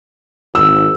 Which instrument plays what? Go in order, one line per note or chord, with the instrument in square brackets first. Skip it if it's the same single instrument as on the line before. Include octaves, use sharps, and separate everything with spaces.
[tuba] G#1 [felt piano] E6